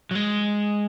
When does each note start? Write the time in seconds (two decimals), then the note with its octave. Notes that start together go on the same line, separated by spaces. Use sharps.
0.11 F#3
0.15 G#3